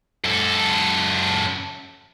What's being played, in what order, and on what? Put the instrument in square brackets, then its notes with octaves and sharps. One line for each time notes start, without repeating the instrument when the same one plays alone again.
[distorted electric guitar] F#2 A4